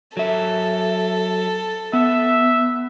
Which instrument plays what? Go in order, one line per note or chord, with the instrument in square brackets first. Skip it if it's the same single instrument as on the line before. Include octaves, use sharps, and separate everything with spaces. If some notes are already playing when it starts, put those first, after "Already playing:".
[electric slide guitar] F#3 E5 [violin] A4
[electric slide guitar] B3 [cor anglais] E5